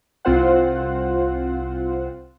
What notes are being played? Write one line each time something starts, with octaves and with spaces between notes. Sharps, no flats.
C2 C4 F4 C5 F#5